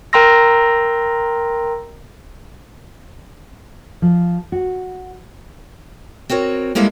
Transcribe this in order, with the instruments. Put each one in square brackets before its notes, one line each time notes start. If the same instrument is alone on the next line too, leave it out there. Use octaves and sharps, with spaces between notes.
[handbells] A#4 G5 A#5 C6 E6 A#6
[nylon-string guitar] F3
F#4
[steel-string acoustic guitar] C4 F#4 A#4 C#5
G3 G#3 A#3 E4 A4 F5